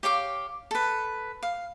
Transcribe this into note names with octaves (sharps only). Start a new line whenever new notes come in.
G4 C#5 F5 D6
A4 B4
F5